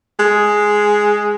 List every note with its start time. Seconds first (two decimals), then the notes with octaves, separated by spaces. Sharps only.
0.19 G#3